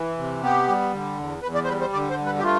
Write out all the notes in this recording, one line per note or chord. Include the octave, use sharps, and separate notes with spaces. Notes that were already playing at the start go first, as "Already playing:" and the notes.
Already playing: E3
C3
B3 G4
G3
D3
E2
E2 B4
D5
C5
G3 B4
C5
D3 D5
C5
G2
B4
G4
A3 F4